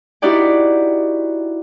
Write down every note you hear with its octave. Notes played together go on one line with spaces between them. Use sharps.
D#4 E4 F#4 G4 D5 G5